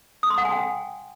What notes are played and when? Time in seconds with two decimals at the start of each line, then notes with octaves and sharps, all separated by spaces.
0.23 D#6
0.30 C6
0.38 F#5
0.45 G#5
0.52 G5